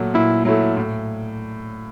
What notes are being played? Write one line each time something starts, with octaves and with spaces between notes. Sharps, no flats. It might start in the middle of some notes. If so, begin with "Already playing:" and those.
Already playing: A#2 F#3 A3
A#2 E4
F#3 A3 E4
A2